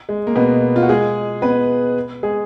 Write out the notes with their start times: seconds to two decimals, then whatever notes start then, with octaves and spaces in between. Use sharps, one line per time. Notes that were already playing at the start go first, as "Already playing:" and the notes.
0.09 G#3
0.27 A#3
0.36 B2 B3
0.76 F4
0.82 F#4
0.89 G#3 G#4
1.42 B3 B4
2.23 G#3 G#4